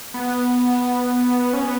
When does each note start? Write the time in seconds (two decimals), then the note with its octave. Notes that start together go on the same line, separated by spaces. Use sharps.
0.14 B3
1.53 C#4
1.63 B3